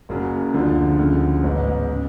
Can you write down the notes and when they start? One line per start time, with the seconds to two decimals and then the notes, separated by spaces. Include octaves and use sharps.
0.09 F#1 F#2 C#3 F#3
0.54 D2 D3 F3
0.99 D2 C#3 F3
1.43 A1 G#2 G#3 B3
1.91 C#3